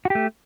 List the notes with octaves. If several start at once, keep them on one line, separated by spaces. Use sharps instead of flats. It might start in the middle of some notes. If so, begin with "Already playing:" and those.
A3 F#4 G4